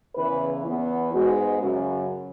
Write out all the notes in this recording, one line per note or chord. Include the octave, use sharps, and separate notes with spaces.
E2 C#3 E3 B4
E2 E3 B3
G#2 G#3 B3 F#4
F#2 C#3 F#3 F#4